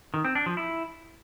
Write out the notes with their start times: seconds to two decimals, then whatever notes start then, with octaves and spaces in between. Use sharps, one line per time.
0.14 D#3
0.25 C4
0.35 D4
0.46 F3
0.57 E4